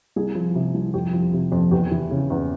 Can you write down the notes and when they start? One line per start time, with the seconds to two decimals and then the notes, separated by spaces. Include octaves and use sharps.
0.16 C2 G#4
0.35 F3
0.55 C3
0.75 C2
0.94 F2 G4
1.13 F3
1.33 C3
1.52 F2
1.71 E2 G4
1.91 E3
2.11 C#3
2.30 E2